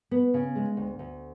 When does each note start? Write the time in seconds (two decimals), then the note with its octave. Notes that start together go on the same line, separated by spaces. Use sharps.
0.11 B3
0.34 C#3
0.55 G#3
0.77 D2
0.99 D2